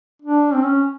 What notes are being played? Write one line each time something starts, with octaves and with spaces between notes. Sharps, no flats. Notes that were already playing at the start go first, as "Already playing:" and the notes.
D4
C4
C#4